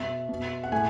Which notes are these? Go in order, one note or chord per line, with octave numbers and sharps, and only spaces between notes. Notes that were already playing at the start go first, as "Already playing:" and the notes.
Already playing: B2 E5
B2
F#5
A2 G#5